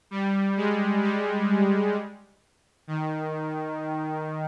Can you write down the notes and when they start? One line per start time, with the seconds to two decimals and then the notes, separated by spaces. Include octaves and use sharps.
0.11 G3
0.57 G#3
1.03 G3
2.87 D#3